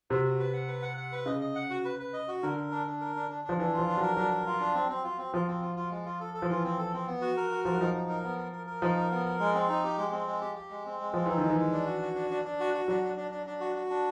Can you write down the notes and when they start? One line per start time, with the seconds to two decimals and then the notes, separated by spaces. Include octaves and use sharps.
0.10 C3 F#4
0.25 F#4
0.39 B4
0.53 F#5
0.68 B4
0.82 F#5
0.97 F#5
1.12 B4
1.26 C#3 D#5
1.41 D#5
1.55 F#5
1.70 F#4
1.85 B4
1.99 B4
2.13 D#5
2.28 F#4
2.43 D3 A#4
2.57 A#4
2.71 D4
2.87 D4
3.00 A#4
3.16 D4
3.29 D4
3.44 F3 D4
3.58 E3 D4
3.74 F3 F4
3.88 D4
3.97 F#3 A#4
4.16 F#3 D4
4.31 A#4
4.46 F4
4.61 D4
4.75 C4
4.89 C4
5.04 F4
5.18 C4
5.33 F3 F4
5.47 C4
5.62 F4
5.76 F4
5.91 G#3
6.06 F4
6.20 A4
6.34 A4
6.42 F3
6.49 E3 F4
6.64 C4
6.79 A4
6.93 C4
7.07 B3
7.21 F#4
7.37 A#4
7.51 F#4
7.65 F3 A#4
7.73 F#3
7.80 F3 D#4
7.94 D#4
8.09 A#4
8.24 B3
8.38 A#4
8.52 A#4
8.67 A#4
8.82 F3 D#4
8.97 A#4
9.11 B3
9.26 A#4
9.40 G#3
9.54 C4
9.69 D#4
9.84 G4
9.98 G#3
10.12 C4
10.27 G#3
10.41 G4
10.56 G4
10.70 G#3
10.85 C4
11.00 G#3
11.14 F3 C4
11.26 E3 D#4
11.38 D#3
11.43 G#3
11.50 E3
11.57 G#3
11.72 D4
11.86 F#4
12.02 F#4
12.15 D4
12.31 D4
12.45 D4
12.60 F#4
12.74 F#4
12.88 F#3 D4
13.03 D4
13.17 D4
13.31 D4
13.46 D4
13.61 F#4
13.76 F#4
13.90 D4